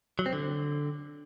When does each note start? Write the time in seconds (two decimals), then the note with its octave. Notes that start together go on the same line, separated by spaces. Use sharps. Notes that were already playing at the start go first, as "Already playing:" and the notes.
0.19 F#3
0.26 C4
0.33 D3